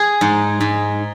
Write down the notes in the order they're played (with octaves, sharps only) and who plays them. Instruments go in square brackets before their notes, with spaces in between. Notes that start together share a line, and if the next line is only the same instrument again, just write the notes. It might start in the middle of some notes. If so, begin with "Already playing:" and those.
Already playing: [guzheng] G#4
G#2
G#2